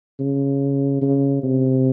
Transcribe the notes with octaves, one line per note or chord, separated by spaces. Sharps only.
C#3
C#3
C3